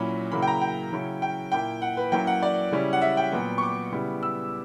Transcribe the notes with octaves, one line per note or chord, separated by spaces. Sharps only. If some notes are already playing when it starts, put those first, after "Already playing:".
Already playing: A#2 F#3 C#4 E4 B5
C#3 F#3 A#3 E4 B5
G5
A#5
G5
C#3 F#3 C#4 E4
G5
A#2 A#3 E4 G5
F#5
B4
F#3 A#3 C#4 E4 G5
F#5
D5
C#3 G3 C#4 E4
F#5
E5
G5
A#2 F#3 B3
C#6
D6
C#3 G3 B3 E4
E6